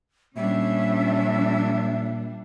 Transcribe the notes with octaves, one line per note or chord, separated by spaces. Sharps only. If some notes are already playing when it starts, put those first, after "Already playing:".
A#2 F3 G3 C#4 D4 E5